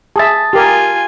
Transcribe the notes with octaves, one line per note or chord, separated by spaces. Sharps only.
G#4 E5 A5 D#6 A6
F4 G4 A#4 G#5